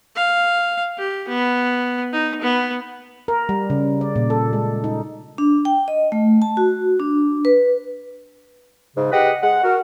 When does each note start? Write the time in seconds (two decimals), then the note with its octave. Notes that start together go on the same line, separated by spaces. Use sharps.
0.16 F5
0.98 G4
1.29 B3
2.13 D#4
2.42 B3
3.28 A#4
3.49 G3
3.70 C#3
4.01 D5
4.16 A#2
4.30 A4
4.53 G#3
4.84 D#4
5.38 D4
5.65 G5
5.88 D#5
6.12 A3
6.42 A5
6.57 F#4
7.00 D4
7.45 B4
8.96 G#2 C#3
9.12 G4 G#4 B4 D#5 F#5
9.42 G#3 F#5
9.63 F#4 A#4